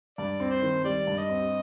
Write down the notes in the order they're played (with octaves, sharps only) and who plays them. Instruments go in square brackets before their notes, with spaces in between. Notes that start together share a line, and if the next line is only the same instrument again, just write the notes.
[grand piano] G2 [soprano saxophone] D5
[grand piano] C4
[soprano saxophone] C5
[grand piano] D#3
[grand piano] G3 [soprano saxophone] D5
[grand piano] G2
[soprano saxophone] D#5
[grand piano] C4